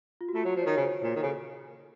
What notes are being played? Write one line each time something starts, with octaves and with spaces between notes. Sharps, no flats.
F4
F#4
A3 F4
F#3 F#4
F3
C#5
D#3
C#3 C5
A#2
D#3
C#3 A4